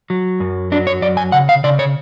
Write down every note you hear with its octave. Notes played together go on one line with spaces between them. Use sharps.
F#3
F#2
F#3 D4
C#5
F#2 D5
G#5
C#3 F#5
F5
C#3 D5
C#5